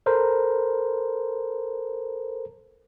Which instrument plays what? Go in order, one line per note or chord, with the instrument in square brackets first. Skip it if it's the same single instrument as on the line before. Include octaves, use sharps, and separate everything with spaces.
[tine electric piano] A4 A#4 C5